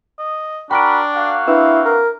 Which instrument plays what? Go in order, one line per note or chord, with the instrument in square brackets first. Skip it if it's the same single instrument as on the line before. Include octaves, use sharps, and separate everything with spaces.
[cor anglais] D#5
[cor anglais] D4 [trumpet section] F#4 A#4 B5 [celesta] G5 C#6 D7
[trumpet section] A#3 F#4 F5
[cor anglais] C4 [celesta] D4 B4 [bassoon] E4
[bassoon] A#4